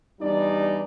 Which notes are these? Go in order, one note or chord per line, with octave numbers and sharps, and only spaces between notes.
E2 G3 D4 D#4 D5